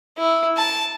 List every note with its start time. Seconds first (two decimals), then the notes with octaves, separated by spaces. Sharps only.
0.18 E4
0.57 A5